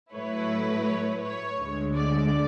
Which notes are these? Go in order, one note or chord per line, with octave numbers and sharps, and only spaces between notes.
A2 F#3 A3 E4 B4 C#5
C#5
C#5
D2 D3 G#3
D5